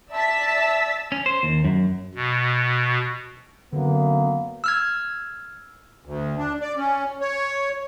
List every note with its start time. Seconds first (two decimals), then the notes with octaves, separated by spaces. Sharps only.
0.11 D5 E5 A5 E6 A6 B6
1.12 C#4
1.26 C5
1.43 D#2
1.65 F#2
2.15 B2
3.73 F#2 D3 A#3 B3
4.64 E6 F6 G#6
6.05 D2
6.38 D4
6.61 D5
6.77 C#4
7.21 C#5